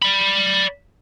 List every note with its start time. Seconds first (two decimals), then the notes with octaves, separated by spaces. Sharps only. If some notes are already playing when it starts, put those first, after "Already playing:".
0.02 D5 B5